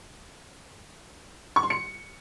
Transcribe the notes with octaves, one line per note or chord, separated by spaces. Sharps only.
C#6
C6
C#7